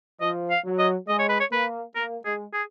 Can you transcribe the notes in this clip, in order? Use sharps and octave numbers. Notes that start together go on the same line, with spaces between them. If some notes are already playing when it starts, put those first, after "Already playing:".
F3 D#5
F5
F#3
D#5
G#3 D#5
C#5
B4
C#5
A#3 B4
A#3 A#4
G#3 G#4
G#4